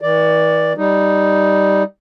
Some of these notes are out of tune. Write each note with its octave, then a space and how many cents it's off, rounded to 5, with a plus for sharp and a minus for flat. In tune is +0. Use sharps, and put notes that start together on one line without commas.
E3 -45 D5 +0
G3 +0 D#4 +0